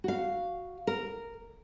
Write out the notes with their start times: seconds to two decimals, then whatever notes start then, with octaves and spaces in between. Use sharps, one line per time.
0.04 F#4 F5
0.87 A#4